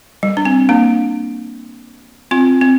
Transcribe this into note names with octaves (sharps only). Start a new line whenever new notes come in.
G3
D4
C4
A#3 D4
C4 F4
C4